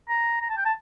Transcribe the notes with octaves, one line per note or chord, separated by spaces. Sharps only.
A#5
A#5
A5
G5
A5